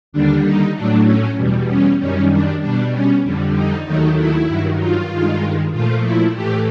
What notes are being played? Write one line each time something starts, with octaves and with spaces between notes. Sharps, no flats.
D#2 D3 G3 D4
D#4
A2 F#3 A3 D4
C#4
E2 B2 G3
C#4
F#2 D#3 G3 C#4
D4
B2 G3 D4
C#4
F2 D3 G3
D#4
D#2 D#3 F#3 A3 D#4
E4
G2 D#3 F#3
F4
G2 D#3 G#3
A#2 F3 A3 F4
E4
A2 E3 A3 G4